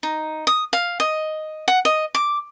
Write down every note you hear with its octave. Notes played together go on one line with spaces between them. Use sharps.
D#4
D#6
F5
D#5
F#5
D#5
D6